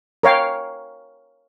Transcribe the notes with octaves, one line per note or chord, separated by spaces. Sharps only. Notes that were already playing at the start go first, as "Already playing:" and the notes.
A#4 C#5 F5 G5